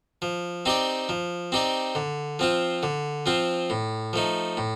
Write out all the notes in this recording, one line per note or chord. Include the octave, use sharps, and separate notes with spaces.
F3
C4 D#4 G4 D5
F3
C4 D#4 G4 D5
D3
F3 C4 F4
D3
F3 C4 F4
A2
F3 A3 D#4
A2